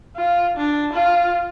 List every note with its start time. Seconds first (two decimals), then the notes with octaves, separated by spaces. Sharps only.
0.16 F4
0.57 D4
0.93 F4